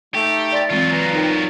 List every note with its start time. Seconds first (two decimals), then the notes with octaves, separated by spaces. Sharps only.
0.15 A3 D#4 G4 A4
0.52 D5 C6 A6
0.70 E3 F#3 G#3 C4 F4
0.90 B4 G#5 A#5
1.13 D#4 A#4 G5